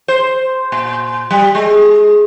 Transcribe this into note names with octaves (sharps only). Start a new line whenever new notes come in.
C5
A#2
G3
G#3